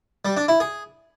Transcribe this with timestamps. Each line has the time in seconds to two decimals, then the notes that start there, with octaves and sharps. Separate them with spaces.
0.25 G3
0.37 D4
0.48 E4
0.60 G#4